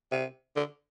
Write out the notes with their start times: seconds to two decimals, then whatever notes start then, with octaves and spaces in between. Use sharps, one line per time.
0.12 C3
0.56 D3